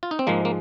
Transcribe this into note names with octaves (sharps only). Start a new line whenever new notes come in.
F4
D#4
C4
G#2 F3 G#3 A#3
A#3